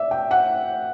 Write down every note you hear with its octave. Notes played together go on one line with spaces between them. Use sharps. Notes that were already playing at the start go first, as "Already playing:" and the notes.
Already playing: D5 E5
G5
F#5